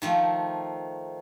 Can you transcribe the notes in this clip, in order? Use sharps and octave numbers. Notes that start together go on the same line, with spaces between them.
D#3 F3 A3